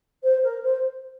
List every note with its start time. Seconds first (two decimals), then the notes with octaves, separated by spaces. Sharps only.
0.23 C5
0.43 A#4
0.63 C5